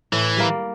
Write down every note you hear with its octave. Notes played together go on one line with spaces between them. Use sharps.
A2 E3
G3 A#3